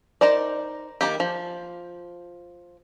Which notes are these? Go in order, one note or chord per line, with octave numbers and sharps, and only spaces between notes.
D#4 A#4 C5 D5
D#3 E3 A#3 G4
F3